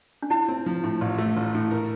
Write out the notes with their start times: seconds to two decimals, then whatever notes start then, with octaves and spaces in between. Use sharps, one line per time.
0.22 D4
0.30 E4 F4
0.48 C4
0.66 F3
0.83 A2
1.01 A1
1.18 A3
1.37 A1
1.55 A2
1.71 A#4